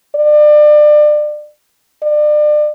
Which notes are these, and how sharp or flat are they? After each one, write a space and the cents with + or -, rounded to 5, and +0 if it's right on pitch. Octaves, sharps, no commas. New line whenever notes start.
D5 +30
D5 +35